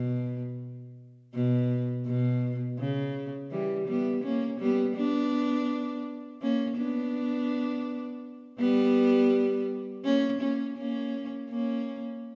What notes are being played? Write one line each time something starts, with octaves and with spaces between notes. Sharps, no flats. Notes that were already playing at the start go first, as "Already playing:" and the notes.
Already playing: B2
B2
B2
C#3
E3 G3
G3 B3
A#3 C#4
G3 B3
B3 D4
A#3 C#4
B3 D4
G3 B3
A#3 C#4
A#3 C#4
A#3 C#4
A#3 C#4